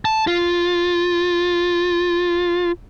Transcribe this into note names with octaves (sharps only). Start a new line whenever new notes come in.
A5
F4